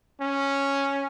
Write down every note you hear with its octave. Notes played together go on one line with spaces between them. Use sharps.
C#4